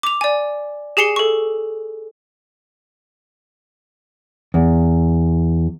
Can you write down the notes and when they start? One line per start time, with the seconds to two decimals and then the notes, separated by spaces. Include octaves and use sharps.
0.03 D6 F7
0.21 D5 G#5
0.97 G4 G#4 G#5 C7 C#7 G7
1.16 A4 C#6
4.54 E2